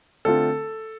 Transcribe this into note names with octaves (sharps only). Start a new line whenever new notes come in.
D3 A3 C4 F4 A4